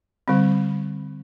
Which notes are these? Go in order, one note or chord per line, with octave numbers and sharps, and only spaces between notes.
D3 G3 C4